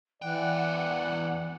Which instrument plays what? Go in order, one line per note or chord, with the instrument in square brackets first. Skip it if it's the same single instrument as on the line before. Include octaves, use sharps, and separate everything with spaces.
[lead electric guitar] E2 G5 [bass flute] E3 [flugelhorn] D5 [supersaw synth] F#5